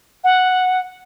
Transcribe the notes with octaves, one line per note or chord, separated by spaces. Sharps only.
F#5